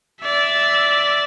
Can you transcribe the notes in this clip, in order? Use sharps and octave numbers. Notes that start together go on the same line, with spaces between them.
D5 E5